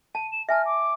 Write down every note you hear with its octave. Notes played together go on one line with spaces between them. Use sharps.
A5 D#7
E7
E5 G#5 A5 F6
D6